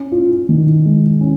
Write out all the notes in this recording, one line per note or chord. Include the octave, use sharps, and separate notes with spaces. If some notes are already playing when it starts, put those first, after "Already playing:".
Already playing: C#4
F4
D#3
G#3
C#4